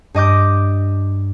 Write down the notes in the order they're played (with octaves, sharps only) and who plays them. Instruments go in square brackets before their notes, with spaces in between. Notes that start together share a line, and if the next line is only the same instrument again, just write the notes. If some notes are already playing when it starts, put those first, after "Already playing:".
[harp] G2 D#5 D6 G6